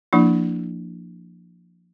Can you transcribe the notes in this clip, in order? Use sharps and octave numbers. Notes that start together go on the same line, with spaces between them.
F3 A#3 D4 E4